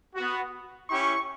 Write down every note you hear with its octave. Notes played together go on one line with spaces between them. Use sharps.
B3 F#4
C#4 E4 G4 C#6